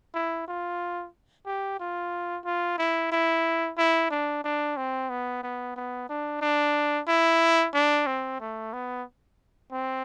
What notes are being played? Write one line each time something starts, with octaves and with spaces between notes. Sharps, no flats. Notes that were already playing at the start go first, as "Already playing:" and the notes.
E4
F4
G4
F4
F4
E4
E4
E4
D4
D4
C4
B3
B3
B3
D4
D4
E4
D4
C4
A3
B3
C4